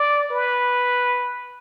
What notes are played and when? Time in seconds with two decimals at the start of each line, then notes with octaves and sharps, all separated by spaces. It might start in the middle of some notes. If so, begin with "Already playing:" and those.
Already playing: D5
0.30 B4